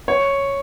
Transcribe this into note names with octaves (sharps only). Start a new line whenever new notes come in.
C#5